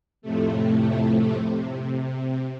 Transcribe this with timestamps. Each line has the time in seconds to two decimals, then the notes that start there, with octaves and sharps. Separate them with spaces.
0.22 F2 A2 C3 A3
1.44 C3